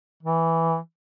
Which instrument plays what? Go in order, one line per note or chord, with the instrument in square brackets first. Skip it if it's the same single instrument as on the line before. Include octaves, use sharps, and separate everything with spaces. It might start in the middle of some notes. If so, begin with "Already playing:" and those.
[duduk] E3